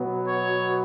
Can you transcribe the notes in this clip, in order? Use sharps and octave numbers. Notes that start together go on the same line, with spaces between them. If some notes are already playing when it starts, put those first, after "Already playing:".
Already playing: B2 F#3 B3
C#5